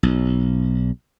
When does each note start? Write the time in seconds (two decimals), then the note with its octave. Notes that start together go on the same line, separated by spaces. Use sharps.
0.03 B1